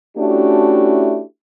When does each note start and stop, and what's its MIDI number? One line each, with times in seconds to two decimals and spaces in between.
0.18 1.22 57
0.18 1.22 61
0.18 1.22 62
0.18 1.22 64
0.18 1.22 66
0.18 1.22 67